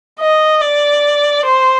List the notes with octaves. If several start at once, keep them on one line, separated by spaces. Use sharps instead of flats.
D#5
D5
C5